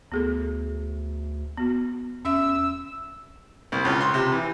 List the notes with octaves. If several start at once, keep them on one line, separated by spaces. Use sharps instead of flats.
D2 B3 G#4 A4
B3 F#4
E2 C#4 E5 E6
C2
C#2
C6
C3
E3